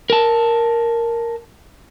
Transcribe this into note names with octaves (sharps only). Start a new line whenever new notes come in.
A#4 A5